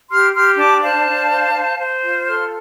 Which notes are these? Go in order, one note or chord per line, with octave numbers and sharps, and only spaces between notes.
G4 C6 F6
G4 C6 F6
D4 A5 D6
C5 F5 A5
D4
C5
C5
C5
F4
A4 C6 F6